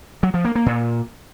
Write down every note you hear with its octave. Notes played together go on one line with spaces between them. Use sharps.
F#3
F3
A#3
A#3
A#2